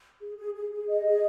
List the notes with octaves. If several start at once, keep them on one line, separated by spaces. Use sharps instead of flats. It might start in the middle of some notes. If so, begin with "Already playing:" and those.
G#4
G#4
G#4
G#4
D#5
G#4